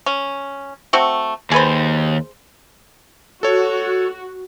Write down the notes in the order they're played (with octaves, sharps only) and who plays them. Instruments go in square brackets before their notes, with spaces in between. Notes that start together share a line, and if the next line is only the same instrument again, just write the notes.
[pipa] C#4
A3 C4 F#4
[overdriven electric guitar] D#2 [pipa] G#4 B4 C5
[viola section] F#4 [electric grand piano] A4 C#5